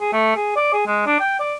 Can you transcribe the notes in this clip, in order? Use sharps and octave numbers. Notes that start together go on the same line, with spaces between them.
G#4
A3
G#4
D5
G#4
G#3
D4
G5
D5